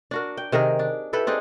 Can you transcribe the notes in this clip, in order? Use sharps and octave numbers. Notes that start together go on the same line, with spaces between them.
D4 F#4 A#4
G5
C3 D#3 G#4 A#4
D4
E4 G4 A4 B4
C4 D4 D#4 G#4